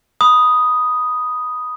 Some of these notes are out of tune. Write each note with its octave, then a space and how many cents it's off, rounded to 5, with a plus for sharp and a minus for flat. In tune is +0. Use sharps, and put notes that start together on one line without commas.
B5 +0 D#6 +0